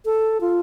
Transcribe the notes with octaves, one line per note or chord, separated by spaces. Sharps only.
A4
F4